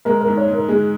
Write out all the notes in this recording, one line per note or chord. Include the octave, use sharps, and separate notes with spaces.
G#3 A#4
A#4
G#2
C#5
G#2
A#4
G#3 G#4